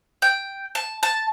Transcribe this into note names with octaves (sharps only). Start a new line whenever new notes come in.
G5
A5
A5